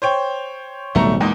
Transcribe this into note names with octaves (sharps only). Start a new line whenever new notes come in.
C5 C#5 G5
D1 B1 G3 A3 A#5 C#6
E2 A#2 G#3 D#4